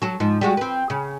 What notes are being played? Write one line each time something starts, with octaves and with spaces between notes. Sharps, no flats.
F#3 A4
G#2 F3
G3 G#3 F#4
C4 B4
C#3